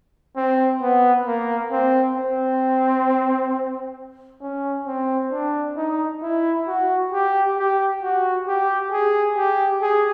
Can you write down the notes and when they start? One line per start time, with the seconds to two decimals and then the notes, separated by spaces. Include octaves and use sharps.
0.36 C4
0.81 B3
1.26 A#3
1.71 C4
2.16 C4
4.41 C#4
4.87 C4
5.32 D4
5.77 D#4
6.22 E4
6.67 F#4
7.12 G4
7.58 G4
8.02 F#4
8.48 G4
8.92 G#4
9.37 G4
9.82 G#4